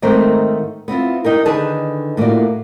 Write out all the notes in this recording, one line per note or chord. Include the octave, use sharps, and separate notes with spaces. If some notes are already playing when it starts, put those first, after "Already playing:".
G#2 D#3 A3 C4 A#4 C5
B3 C4 E4 F4
D#4 G4 A#4
D3 D#3 D#4 G#4 B4 A5
A2 A#3 F4 F#4 D5